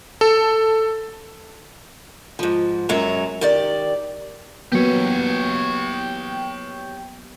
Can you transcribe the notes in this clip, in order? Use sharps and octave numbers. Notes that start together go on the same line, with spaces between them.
A4
G#2 F3
F#2 F#3 G#3 C#5 A#5
D#3 G4 D5
F#3 A#3 B3 G4 C#5